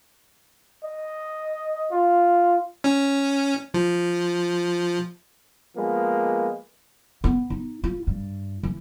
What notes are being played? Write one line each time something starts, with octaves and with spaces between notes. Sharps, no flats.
D#5
F4
C#4
F3
F3 G#3 A#3 B3
B3
D#4
F4
G2
E3